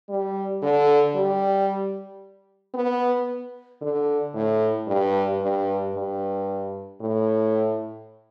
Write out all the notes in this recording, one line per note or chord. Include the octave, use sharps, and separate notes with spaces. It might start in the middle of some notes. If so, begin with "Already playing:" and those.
G3
D3
G3
B3
D3
A2
G2
G2
G2
A2